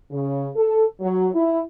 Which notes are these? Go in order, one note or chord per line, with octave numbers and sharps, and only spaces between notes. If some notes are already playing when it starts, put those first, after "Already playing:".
C#3
A4
F#3
E4